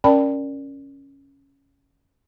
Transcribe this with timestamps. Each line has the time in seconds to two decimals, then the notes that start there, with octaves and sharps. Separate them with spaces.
0.04 C#4 A#4 D5 G5 A5 B5